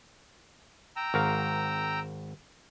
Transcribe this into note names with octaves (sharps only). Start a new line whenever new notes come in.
G5 A#5 E6
G#1 A#4 F5